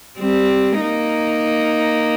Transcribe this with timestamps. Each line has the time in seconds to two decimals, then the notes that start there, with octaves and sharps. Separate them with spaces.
0.18 G3 C4
0.80 A#3 D#4